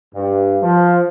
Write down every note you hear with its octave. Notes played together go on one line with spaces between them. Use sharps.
G2
F3